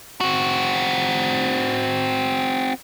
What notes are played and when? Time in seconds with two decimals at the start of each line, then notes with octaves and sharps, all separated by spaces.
0.21 C4 F#4